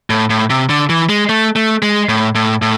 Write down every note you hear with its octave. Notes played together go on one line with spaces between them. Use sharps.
A2
A2
C3
D3
E3
G#3
A3
A3
G#3
A2
A2
A2